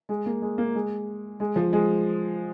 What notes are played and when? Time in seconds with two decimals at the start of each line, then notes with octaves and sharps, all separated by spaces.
0.09 G#3
0.26 A#3
0.42 G#3
0.58 A#3
0.75 G#3
1.40 G#3
1.56 F3
1.73 G#3